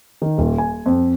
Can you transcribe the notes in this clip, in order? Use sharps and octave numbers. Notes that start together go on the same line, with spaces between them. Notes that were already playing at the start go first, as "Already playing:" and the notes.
D#3
D#1
G#5
F2